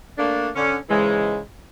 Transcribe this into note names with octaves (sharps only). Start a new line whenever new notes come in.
A3 A#3 D4
D3 C#4
G#2 C#3 E3 G#3